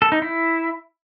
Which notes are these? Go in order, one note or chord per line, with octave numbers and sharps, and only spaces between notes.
A4
D#4
E4